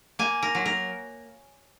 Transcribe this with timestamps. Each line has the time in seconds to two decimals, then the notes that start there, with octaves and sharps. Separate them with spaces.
0.19 A#3 G#5
0.43 A#4
0.55 F#3
0.66 A#4